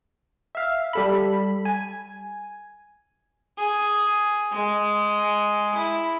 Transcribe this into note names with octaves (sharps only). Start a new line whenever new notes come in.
E5 F5
G3 A4 B5
G#5
G#4
G#3
E4